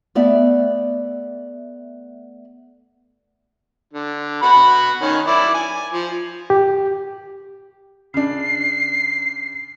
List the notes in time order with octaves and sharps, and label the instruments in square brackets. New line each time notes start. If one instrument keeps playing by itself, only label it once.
[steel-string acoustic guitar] A3 B3 D5 E5
[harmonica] D3
F#4 F#5 B5
D#3 C#4
E4 D5
G#5
F3
[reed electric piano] G4
[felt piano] C#3 D4 [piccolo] C7